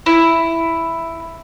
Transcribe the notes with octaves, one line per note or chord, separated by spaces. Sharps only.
E4